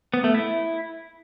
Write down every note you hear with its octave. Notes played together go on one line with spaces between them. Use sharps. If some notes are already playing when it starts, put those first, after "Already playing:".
B3
A3
E4